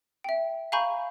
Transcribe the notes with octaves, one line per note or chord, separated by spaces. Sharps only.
E5 G5
F5 G#5 A#5 B5 C#6 G6